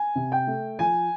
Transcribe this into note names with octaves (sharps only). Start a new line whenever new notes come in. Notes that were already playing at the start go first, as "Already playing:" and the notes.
Already playing: G#5
C3
G5
A3
F3 G#5